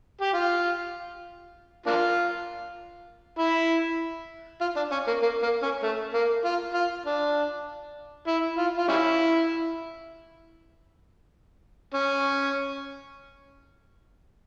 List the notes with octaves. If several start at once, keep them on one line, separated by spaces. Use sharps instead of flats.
G4
F4
A#3 D4 F4
E4
F4
D4
C#4
A#3
A#3
A#3
C#4
A3
A#3
F4
F4
D4
E4
F4
F4
G3 C#4 E4
C#4